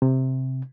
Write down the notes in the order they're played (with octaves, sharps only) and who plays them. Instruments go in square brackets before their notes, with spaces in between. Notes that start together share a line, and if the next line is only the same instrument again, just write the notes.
[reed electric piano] C3